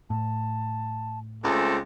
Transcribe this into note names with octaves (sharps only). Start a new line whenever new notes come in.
A2 A5
C#2 A3 C4 A4 G#5